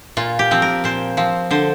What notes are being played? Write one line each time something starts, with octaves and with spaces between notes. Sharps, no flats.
A#2 F4
G4
F3 C4
A#4
A#2 C5
F3 C4
D3 C5